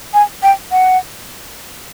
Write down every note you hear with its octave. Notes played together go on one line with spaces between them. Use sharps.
G#5
G5
F#5